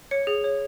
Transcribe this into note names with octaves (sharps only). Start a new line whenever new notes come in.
C#5 C#7
G#4
C#5